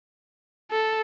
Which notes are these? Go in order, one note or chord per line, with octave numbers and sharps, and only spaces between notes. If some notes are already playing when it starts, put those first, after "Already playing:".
A4